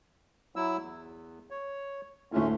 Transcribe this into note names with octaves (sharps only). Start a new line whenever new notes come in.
F#3 E4 E6
E2
C#5
D2 A2 G#3 A3 C#4